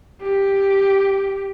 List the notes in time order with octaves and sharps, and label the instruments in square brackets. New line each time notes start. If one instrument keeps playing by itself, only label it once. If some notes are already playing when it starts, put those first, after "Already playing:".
[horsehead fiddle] G4